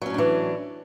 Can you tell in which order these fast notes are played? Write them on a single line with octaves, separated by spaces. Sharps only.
F#3 C#4 A2 D4 E3